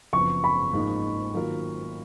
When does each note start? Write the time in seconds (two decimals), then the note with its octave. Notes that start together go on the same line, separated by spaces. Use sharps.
0.13 F#1 F2 F3 B3 C#6
0.44 B5
0.73 G#2 F3 A#3 D#4
1.34 D#3 F#3 A#3 F4 A#4